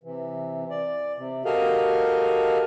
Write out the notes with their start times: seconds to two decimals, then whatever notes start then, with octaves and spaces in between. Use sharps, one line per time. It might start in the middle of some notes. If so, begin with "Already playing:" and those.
0.04 C3 E3
0.70 D5
1.17 C3
1.45 F#4 G4 A4 A#4 D#5 F5